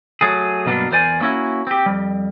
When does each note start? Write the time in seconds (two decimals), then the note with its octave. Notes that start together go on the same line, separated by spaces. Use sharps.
0.21 F#3 A3 G#4
0.66 G2 B2 F#3 A#3 B3 D4
0.91 E2 A#4 C5 D5 G#5
1.20 F#3 A#3 C#4 E4 F#4
1.67 C4 G4
1.86 F2 G3